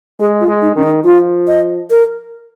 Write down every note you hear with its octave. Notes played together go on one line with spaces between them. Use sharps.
G#3 G#4
F4
G#3
D#4
D#3 C#4
D#4
F3 F4
D#5
A#4